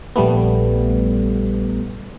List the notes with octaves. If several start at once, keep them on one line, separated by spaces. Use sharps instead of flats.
A#1 G3 A3 B3